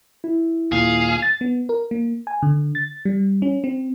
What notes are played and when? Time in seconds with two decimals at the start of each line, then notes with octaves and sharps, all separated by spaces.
0.24 E4
0.72 D#2 A#2 G#4 F5
1.22 A6
1.41 B3
1.69 A#4
1.91 A#3
2.27 G#5
2.42 D3
2.75 A6
3.05 G3
3.42 C#4
3.64 C4